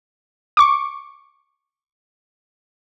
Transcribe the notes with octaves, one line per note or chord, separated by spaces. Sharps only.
C#6 D6